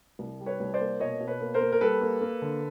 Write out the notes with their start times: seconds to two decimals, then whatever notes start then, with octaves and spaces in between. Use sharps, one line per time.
0.19 C2
0.40 G3
0.46 B4 C#5
0.60 C2
0.74 C5 D5
0.80 A#3
1.00 B2 C#5 D#5
1.20 B2
1.27 B4 C#5
1.40 A#3
1.54 A#4 C5
1.60 A#3
1.72 A#4
1.81 G3 A4 B4
2.01 A#3
2.21 A#3
2.42 D3